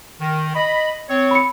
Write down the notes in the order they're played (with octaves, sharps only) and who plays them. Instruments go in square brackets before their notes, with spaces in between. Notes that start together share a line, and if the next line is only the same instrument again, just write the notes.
[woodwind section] D#3
D#5 B5
C4 C#5
[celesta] B5 C#7